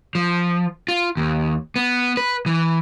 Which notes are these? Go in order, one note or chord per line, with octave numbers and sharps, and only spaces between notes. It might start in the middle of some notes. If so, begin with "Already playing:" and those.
F3
F4
D#2
B3
B4
E3